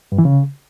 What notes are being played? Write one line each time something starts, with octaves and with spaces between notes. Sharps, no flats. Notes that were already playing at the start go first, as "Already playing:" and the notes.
G2
E3
C#3